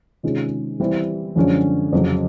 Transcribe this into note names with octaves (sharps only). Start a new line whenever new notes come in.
C3 D#3 G#3 C#4 F4
E3 G3 C4 E4 G4
F#2 D3 F3 G#3 C#4
F2 C#3 F#3